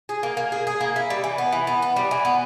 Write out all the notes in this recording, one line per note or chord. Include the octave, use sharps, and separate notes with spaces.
G#4
A#3
A#3
G#4
G#4
A#3
E4
G3
E3
B3
E3
B3
B3
G3
E3
B3